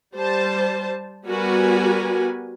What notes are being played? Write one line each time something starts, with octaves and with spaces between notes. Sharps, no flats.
G3 C5 A5
G3 B3 F#4 A#4 B4 G#5